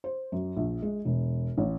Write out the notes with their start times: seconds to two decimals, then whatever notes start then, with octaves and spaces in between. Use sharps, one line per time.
0.04 C5
0.32 F#2
0.57 A#1
0.82 G#3
1.05 E1
1.58 A1